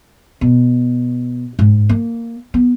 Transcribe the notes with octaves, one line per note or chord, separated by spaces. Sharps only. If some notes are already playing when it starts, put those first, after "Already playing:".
B2
G#2
A#3
B3